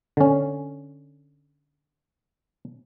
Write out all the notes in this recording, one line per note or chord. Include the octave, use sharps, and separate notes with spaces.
D3 C#4